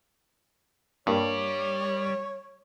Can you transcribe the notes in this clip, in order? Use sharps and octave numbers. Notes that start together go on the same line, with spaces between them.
G2 G3 A#3 C#5